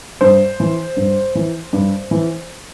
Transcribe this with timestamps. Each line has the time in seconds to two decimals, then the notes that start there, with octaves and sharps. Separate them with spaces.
0.21 G2 C5
0.60 E3
0.97 G2
1.35 E3
1.73 G2
2.11 E3